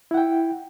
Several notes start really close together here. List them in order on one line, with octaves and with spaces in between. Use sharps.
E4 F#5 G5